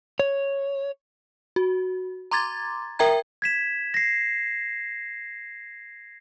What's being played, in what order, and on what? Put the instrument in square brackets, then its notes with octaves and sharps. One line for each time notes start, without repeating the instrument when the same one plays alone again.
[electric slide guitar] C#5
[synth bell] F#4
A#5 C6 D6 G#6 A6
A#4 E5 G5 A#5 G#6
[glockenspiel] G#6 B6 E7
A#6 C7